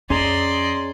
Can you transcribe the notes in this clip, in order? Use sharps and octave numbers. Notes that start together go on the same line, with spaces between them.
F2 C#4 G#4 D5 D#5 A#5 C6